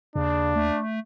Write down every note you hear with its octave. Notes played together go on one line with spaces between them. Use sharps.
D#2 C#3 D4
A3